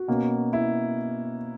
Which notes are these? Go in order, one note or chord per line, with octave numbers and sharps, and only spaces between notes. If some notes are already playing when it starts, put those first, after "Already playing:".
Already playing: F#4
B2 A#3 C#4
E4